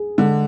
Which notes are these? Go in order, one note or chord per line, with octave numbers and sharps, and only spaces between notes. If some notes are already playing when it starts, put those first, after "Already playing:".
Already playing: G#4
D3 G#3